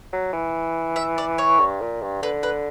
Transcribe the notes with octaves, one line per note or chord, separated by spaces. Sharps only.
F#3
E3
E5
D5
C#5
G2
A#2
G2
D3 B4
B4